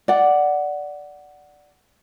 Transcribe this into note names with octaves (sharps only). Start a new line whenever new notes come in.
D5 F#5